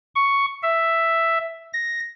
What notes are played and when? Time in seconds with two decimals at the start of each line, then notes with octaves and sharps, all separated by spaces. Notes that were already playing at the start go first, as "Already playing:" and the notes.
0.15 C#6
0.63 E5
1.73 A#6